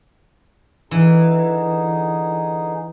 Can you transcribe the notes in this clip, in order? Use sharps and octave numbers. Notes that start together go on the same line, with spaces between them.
D3 E3 D#4 G#4